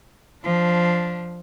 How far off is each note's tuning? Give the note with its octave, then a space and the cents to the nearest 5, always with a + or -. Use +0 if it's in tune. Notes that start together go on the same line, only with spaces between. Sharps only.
F3 +0 D4 +0